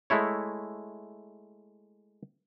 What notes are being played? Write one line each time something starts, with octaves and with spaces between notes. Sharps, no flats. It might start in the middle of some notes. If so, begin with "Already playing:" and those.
G#3 A3 E4 C#5